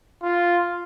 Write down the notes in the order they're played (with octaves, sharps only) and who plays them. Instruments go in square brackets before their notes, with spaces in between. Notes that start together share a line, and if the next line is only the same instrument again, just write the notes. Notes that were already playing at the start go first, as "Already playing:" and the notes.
[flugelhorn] F4